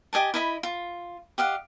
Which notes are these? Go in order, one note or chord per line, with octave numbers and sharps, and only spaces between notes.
G4 D#5 G#5 A5
E4 D#5 B5
F4
G4 D#5 F5 F#5